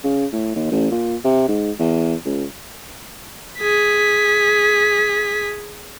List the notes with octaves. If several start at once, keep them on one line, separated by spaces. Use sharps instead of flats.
C#3
A2
D#2
A1
A#2
C3
G#2
E2
C#2
G#4 B6